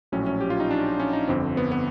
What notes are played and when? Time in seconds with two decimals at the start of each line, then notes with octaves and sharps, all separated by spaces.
0.12 A#1 A2 F#3 C#4
0.26 C#4
0.41 G4
0.50 F4
0.60 D#4
0.71 D4
1.00 C#4
1.13 D#4
1.28 G1 F2 D3 C4
1.57 B3
1.71 B3